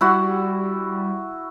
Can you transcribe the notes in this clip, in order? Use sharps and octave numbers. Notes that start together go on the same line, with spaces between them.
G3 E4 F#4 F#5